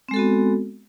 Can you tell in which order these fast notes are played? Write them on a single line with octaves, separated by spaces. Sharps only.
C4 G#3 A4 F#4 B3